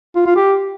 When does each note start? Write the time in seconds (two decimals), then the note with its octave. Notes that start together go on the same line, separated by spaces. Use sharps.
0.16 F4
0.26 F4
0.36 G4